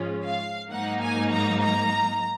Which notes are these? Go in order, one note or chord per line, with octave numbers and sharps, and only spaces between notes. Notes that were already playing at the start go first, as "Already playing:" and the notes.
Already playing: G#2 F3 G#3 C#4 F4
F5
G#2 F#3 A#3 D#4 F#5
G#5
A#5
A#5